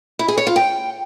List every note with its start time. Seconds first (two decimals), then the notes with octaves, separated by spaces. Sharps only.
0.19 E4
0.28 G#4
0.38 C#5
0.47 F4
0.56 G5